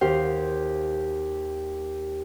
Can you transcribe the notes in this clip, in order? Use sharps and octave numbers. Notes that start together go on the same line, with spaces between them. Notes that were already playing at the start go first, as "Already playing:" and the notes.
D#2 G4 C5 F5